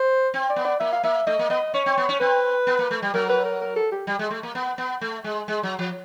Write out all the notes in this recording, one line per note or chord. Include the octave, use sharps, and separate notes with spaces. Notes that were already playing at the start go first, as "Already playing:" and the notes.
Already playing: C5
C4
D5
B3
D5
A#3 E5
F5
A#3 E5
A3 D#5
A#3
B3 D#5
C#4 C#5
C4
B3
C#4
C4 B4
B3
A#3
A3
G3
F#3 A#4
B4
A#4
A#4
A4
G4
G3
G#3
A3
A#3
B3
B3
A3
G#3
G#3
F#3
F3